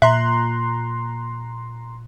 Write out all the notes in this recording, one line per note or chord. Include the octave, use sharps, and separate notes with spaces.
A#2 E5 A#5 C6 F#6